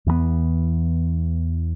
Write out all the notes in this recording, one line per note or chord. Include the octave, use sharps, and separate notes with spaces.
E2 E3 G3 B3